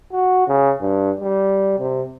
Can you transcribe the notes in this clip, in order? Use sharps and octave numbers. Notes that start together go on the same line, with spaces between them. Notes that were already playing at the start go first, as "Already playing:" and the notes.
F#4
C#3
G2
G3
C3